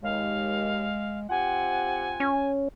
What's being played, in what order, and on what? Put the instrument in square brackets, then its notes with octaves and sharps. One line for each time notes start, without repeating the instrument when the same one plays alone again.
[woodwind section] D#2 [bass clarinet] G#3 [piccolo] F5
[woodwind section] C4 G4 F#5 [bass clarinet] F4 [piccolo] G#5
[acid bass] C#4